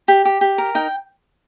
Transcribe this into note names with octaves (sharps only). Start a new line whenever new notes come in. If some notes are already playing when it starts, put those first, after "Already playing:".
G4
G4
G4
A#4
D#4 G5